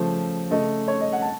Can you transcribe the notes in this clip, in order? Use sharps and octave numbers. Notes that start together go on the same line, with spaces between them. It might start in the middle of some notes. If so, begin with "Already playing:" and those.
Already playing: C#3 F3 A3 C5
C#3 A3 D#5
C#5
D#5
F#5
A5